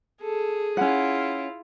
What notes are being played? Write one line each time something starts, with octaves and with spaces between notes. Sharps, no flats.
G#4 A4
C#4 E4 F4 F#5